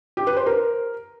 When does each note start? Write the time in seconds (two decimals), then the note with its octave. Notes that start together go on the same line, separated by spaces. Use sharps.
0.17 G4
0.27 B4
0.37 C5
0.46 A#4